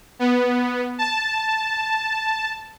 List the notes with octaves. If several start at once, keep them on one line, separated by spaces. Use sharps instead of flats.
B3
A5